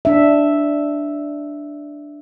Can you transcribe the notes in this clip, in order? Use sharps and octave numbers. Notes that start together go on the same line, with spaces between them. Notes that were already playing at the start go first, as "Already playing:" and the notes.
D4 E5